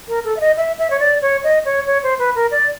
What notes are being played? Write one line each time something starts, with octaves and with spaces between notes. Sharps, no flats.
A#4
A4
E5
D#5
E5
E5
C#5
D5
C#5
D#5
C#5
C#5
C5
B4
A#4
D5